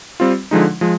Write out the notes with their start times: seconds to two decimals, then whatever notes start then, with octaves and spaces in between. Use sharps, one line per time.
0.20 G3 C4 F4
0.51 D3 F3 G#3 D#4
0.81 F3 G#3